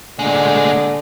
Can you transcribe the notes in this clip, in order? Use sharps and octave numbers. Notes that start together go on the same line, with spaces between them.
A#2 D3 G#3